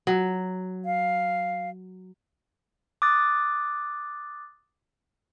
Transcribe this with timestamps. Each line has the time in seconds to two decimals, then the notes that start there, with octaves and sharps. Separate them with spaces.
0.07 F#3
0.85 F5
3.02 D6 D#6 F#6 A6